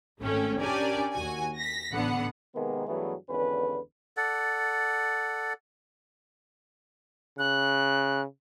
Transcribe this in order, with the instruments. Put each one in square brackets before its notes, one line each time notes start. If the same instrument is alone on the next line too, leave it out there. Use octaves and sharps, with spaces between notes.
[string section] G#1 A3 C#4 A4 G5
C#4 D4 G4 A#4 D5 G#5
D#2 F#4 G#5
A#6 B6
A1 D3 B3 F#5
[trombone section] C3 D#3 G#3 A#3 B3
G2 E3 F#3 A3 B3 G#4
G#1 E2 D3 C#4 B4
[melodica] A4 D5 F#5
[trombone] C#3 [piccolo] F#6